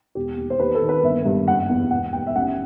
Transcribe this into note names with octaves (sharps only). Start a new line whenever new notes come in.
E1 G4
D#2
C5
D#2 B4
A4
D#3
B4
G1 E5
G2
F#1 F#5
E2
E1 F#5
D#2 G5
E5
A1 F#5